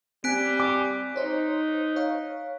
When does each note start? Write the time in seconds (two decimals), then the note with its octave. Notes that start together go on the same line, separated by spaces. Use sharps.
0.24 G3 C4 G#5 F#6 B6 D7
0.60 D6
1.16 D#4 C5 C#5
1.96 C#5 F5